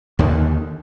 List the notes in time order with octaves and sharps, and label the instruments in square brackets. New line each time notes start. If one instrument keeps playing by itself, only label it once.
[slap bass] D#2 D3 D#3